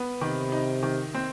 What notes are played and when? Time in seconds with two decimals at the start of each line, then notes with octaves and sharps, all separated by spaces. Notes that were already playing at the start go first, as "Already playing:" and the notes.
Already playing: B3
0.21 C3 D#3
0.52 D#4
0.83 D#3
1.15 C4